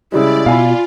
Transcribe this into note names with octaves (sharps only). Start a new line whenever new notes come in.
C#3 G3 G#3 E4 D5
B2 F4 F5 G#5 B5